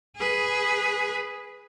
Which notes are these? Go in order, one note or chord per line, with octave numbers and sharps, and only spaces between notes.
G#4 B4